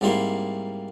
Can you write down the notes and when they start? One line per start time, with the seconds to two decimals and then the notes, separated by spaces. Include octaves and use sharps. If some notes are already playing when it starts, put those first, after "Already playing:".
0.01 C2 G#2 G3 A#3 E4 C6